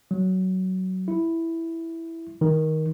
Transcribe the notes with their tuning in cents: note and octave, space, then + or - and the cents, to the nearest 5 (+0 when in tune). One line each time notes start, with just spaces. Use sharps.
F#3 +15
E4 +0
D#3 +15